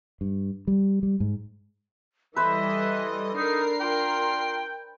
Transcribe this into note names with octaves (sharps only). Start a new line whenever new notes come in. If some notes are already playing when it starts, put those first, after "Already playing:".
G2
G3
G3
G#2
E3 G3 A4 B4 C5 D#5 E5
D4 D#4 A#4 C7
F4 G5